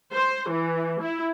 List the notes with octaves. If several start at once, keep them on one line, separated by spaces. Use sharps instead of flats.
C5
E3
E4